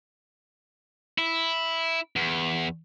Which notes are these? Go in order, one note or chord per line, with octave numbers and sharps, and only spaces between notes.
E4
E2